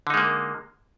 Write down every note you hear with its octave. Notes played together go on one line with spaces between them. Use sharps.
D3 G#3 A#3 D#4